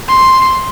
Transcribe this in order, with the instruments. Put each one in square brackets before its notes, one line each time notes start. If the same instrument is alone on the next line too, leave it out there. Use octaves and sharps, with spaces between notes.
[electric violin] C6